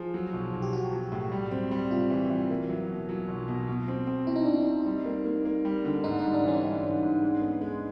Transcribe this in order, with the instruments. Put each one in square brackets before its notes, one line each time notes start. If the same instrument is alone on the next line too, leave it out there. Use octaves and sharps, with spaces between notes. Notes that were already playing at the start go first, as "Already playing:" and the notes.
Already playing: [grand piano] F3 [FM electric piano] G#4
[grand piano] F#3
B1
B1
[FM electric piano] G4
[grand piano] B1 [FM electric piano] F#4
[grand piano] F#3
A2
G3
C4
G3
[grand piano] C3 [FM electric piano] F4
[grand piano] E3
E3
A#3
F#3
B2
F#3
B1
B2
B2
C4
C4
[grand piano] B2 [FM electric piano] E4
[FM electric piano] D#4
[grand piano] C4 [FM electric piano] D4
[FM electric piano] D#4
[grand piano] C4
G3
A#3
A#3
A#3
G3
D3
[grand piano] G#2 [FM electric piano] D#4
[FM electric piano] D#4
[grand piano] G3
[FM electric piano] D4
[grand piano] E3 [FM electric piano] C#4
[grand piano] G3
G#2
G#2
G#3
B3
G#3